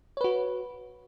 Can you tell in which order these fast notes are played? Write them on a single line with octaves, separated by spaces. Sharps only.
C#5 B4 F#4